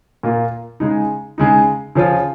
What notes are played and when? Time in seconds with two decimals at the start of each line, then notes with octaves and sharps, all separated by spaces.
0.23 A#2 A#3 F4
0.80 C#3 G#3 D#4
1.38 C#3 G#3 D#4
1.95 C#3 F3 C#4 F4